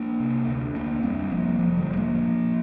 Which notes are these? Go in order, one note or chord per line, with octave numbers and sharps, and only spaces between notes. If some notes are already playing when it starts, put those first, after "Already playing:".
Already playing: A#3 D4
C3
D2
D2 A#3 D4
F2 G3 C4
F1 F3 A#3
F1 F3
D3 G3
F1
F3 A#3
A#2